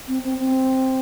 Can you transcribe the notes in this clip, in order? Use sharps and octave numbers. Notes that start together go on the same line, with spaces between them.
C4
C4
C4